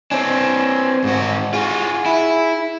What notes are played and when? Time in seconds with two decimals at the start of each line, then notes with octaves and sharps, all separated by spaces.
0.11 C4 D4 G#5
1.04 G#2 F#4
1.54 F4 F#4 G#4
2.06 E4